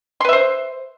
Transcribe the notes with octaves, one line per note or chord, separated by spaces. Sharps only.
B4 C5 E5 C6